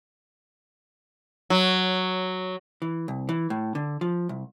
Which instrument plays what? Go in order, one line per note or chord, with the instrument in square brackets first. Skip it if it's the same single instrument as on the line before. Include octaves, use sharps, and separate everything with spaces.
[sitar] F#3
[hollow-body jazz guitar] E3
C2
E3
A2
D3
F3
C2